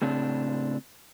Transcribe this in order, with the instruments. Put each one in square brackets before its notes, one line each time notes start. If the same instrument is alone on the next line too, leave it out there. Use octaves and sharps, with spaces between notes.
[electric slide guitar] A2 C#3 C4 D4